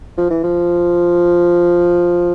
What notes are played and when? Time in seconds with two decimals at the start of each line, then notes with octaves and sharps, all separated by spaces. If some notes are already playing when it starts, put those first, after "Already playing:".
0.18 F3
0.30 E3
0.44 F3